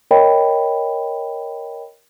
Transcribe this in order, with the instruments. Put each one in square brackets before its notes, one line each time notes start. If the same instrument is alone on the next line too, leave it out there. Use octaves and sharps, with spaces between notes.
[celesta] A#4 C#5 D#5 G5 B5